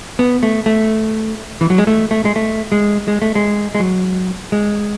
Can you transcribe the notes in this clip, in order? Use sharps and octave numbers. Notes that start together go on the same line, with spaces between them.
B3
A3
A3
E3
F#3
G#3
A3
A3
G#3
A3
G#3
G#3
A3
G#3
G#3
F#3
G#3